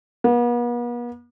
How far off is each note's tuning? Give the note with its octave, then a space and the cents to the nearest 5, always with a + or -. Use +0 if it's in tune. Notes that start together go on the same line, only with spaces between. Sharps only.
B3 -45